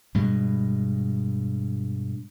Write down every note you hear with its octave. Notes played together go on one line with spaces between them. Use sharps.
G2 B2 G#3